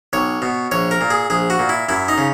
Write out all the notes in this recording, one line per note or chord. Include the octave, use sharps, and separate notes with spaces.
B1 C#5
B2
A#1 C#5
A#4
A#2
G#4
A#1 G#4
F#4
A#2
E4
F#2 E4
D#4
C#3